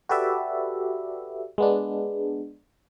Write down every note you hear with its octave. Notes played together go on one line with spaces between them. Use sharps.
F#4 G4 A4 B4 D5 E5
G#3 B3 D4